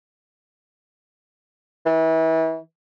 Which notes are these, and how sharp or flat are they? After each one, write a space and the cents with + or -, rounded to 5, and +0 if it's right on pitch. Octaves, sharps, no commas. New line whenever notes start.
E3 -30